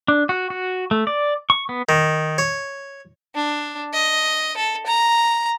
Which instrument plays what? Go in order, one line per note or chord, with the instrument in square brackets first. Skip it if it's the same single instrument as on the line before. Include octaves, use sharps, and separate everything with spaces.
[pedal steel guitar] D4
F#4
F#4
A3
D5
C#6
B3
[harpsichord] D#3
C#5
[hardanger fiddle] D4
D#5
A4
A#5